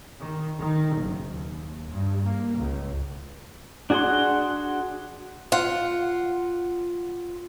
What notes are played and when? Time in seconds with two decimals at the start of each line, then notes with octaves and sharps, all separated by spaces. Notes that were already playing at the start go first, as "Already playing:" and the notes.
0.20 D#3
0.59 D#3
0.96 F#1
1.33 D#2
1.89 G2
2.24 A#3
2.57 C#2
3.90 D4 F#4 G#4 F#5 C6
5.52 F4 F#5